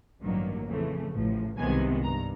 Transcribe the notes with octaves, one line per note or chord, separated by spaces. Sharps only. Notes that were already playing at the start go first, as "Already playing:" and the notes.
A1 G2 D#3 F#3 A#3
F2 C#3 E3 A3
A1 A2 F3
C2 C3 D#3 G#3 B3 G#5
G2 A#5